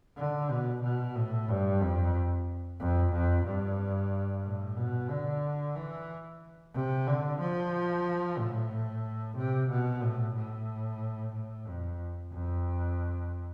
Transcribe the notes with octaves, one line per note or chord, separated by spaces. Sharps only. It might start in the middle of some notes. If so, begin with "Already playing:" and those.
D3
B2
B2
A2
G2
F2
F2
F2
G2
A2
B2
D3
E3
C3
D3
F3
A2
C3
B2
A2
A2
A2
F2
F2